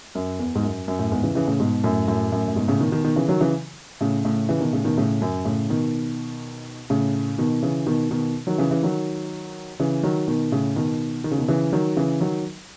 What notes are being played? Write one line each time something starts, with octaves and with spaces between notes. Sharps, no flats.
F#2
E2
G#2
F#2
F#2
A2
E2 G#2
C#3 E3
C#3 E3
A2 C#3
G#2 B2
F#2 A2
F#2 A2
F#2 A2
A2
G#2 B2
A2 C#3
B2 D#3
B2 D#3
B2 D#3
C#3 E3
D#3 F#3
C#3 E3
A2 C#3
A2 C#3
C#3 E3
B2 D#3
A2 C#3
B2 D#3
A2 C#3
F#2
A2 C#3
B2 D#3
A2 C#3
B2 D#3
C#3 E3
B2 D#3
B2 D#3
D#3 F#3
C#3 E3
C#3 E3
D#3 F#3
C#3 E3
D#3 F#3
B2 D#3
A2 C#3
B2 D#3
D#3
C#3
B2 D#3
C#3 E3
D#3 F#3
C#3 E3
D#3 F#3